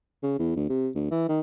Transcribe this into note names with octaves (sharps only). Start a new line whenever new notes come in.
C#3
E2
D2
C3
D2
E3
D#3